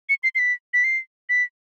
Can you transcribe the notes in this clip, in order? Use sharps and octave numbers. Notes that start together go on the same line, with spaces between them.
C#7
C7
C7
B6
B6
C7
B6